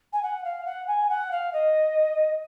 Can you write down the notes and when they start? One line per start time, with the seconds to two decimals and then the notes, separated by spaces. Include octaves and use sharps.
0.12 G#5
0.22 F#5
0.44 F5
0.65 F#5
0.87 G#5
1.09 F#5
1.31 F5
1.53 D#5